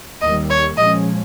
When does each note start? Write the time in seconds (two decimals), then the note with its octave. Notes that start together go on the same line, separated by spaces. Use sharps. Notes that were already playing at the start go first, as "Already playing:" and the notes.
0.21 D#2 D#3 G3 D#5
0.50 C#5
0.77 A#2 F3 G#3 C#4 D#5